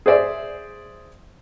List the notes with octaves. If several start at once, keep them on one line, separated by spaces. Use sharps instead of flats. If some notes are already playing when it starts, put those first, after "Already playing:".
G#4 C5 D5 E5